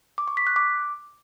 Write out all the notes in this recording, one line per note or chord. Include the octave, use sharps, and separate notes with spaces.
D6
C#6
B6
F#6
D6